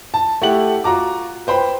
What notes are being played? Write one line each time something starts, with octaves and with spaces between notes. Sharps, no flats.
A5
A3 E4 G4 F#5 F#7
F4 F#4 A#5 D6
B4 C5 G5 B5